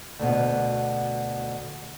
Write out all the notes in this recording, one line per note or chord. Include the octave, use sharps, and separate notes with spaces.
D2 B2